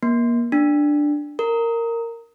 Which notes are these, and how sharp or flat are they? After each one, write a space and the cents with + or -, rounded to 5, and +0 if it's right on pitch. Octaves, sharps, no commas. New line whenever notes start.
A#3 +30
D4 +5
A#4 -15